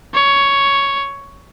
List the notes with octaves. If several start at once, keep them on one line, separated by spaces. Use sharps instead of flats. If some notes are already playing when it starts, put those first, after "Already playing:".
C#5